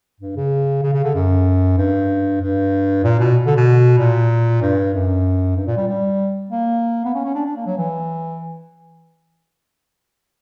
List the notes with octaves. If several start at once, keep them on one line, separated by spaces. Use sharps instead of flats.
G2
C#3
C#3
C#3
D3
F#2
G2
G2
A#2
B2
D3
B2
A#2
G2
F#2
G2
A#2
G3
G3
A#3
B3
C#4
C#4
D4
D4
A#3
F#3
E3